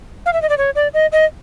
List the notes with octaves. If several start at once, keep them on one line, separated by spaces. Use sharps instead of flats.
F5
E5
D#5
D5
C#5
D5
D#5
D#5